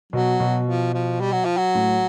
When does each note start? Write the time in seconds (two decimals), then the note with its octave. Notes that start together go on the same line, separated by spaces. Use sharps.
0.13 B2 F#3
0.40 B2
0.66 F3
0.94 F3
1.20 G3
1.32 F#3
1.45 F3
1.57 F#3
1.75 A2